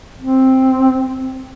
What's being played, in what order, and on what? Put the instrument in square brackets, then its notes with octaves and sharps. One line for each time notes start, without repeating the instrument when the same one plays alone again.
[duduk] C4